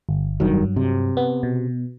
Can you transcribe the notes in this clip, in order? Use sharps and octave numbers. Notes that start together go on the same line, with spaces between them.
G1
F1 G2 D#3 F#3
C3
B3
B2